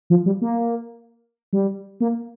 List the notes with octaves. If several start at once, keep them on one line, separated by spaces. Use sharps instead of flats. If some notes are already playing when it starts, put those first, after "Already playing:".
F3
G3
A#3
G3
A#3